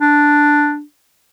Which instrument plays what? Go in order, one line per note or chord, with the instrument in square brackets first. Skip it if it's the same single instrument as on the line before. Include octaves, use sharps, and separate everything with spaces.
[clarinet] D4